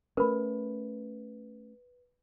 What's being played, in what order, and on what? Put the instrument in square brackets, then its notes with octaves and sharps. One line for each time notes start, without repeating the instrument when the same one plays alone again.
[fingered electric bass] A3 A#3 C#4 [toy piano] A#4 B5 [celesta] B4